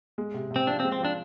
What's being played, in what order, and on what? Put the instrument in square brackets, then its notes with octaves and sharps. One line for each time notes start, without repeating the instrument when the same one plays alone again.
[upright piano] G#3
C3
C3
[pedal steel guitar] C4
[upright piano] F3 [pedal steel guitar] D4
[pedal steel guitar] C4
[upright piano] G#3
[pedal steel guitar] C4
[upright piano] F3 [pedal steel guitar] D4